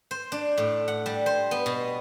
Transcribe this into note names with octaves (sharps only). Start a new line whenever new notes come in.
C5
D4
A2
F#5
G3
C5
B3
B2